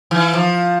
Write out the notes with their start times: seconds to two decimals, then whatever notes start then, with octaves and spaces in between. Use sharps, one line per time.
0.11 E3
0.33 F3